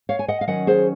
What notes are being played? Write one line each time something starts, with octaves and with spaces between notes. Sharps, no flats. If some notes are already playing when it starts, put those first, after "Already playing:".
C#5 F5
G#5
D#5 F#5
F5
D#3 F#3 C#4 D#5 F#5
G#4 C5